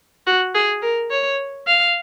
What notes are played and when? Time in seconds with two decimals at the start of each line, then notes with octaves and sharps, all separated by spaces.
0.27 F#4
0.55 G#4
0.83 A#4
1.11 C#5
1.67 F5